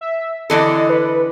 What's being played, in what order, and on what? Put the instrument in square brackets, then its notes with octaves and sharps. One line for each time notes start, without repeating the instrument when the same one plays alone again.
[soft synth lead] E5
[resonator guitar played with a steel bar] D3 E3 A4 [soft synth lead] D#5
[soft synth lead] B4